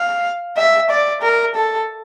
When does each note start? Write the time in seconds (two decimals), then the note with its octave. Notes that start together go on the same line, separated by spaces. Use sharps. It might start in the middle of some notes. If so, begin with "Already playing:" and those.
Already playing: F5
0.57 E5
0.90 D5
1.22 A#4
1.55 A4